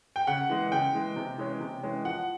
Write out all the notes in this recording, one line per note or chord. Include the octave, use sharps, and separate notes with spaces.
G5
C#3 F#5
E3 G#3
C#3 G5
E3 G#3
C3
E3 G#3 C#4
C3
E3 G#3 C#4
F3 F#5